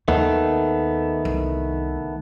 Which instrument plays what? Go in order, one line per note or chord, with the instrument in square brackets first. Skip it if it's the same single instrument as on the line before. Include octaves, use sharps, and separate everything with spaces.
[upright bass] D#2 [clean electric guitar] D#3 A3 B3
[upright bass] C2